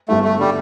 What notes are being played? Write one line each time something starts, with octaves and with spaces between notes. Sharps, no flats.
G1 G2 G3 A3 E4
A3
D3 G3